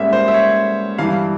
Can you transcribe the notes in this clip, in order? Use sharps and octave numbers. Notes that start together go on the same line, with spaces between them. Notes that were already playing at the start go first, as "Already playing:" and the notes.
Already playing: G#2 G3 A#3 C#4 E5
C5
E5
C#5
G2 E3 G3 F5